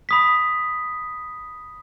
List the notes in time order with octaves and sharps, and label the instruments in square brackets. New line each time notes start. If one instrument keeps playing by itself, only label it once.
[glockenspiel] B5 D#6 B6